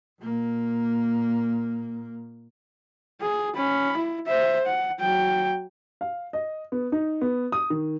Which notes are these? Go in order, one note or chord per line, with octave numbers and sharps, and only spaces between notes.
A#2 A#3
G#4
C#4 B5
E4
C5 E5
F#5
F#3 G5
F5
D#5
B3
D#4
B3
D#6
D#3